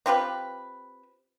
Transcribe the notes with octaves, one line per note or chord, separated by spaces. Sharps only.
C4 F4 G4 B4